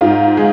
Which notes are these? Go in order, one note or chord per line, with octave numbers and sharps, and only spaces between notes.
G#2 F4
G#3